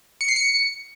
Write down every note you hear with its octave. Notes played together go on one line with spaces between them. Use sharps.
C#7
C7
C#7